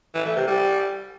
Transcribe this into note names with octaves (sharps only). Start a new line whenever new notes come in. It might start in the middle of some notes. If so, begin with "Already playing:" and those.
E3
A3
C3
G3